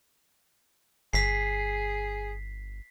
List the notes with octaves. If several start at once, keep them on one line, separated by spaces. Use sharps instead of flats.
G1 G#4 B6 C7